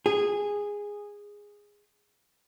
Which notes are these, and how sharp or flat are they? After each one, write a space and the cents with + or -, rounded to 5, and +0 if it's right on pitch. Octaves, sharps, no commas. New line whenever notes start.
G#4 -10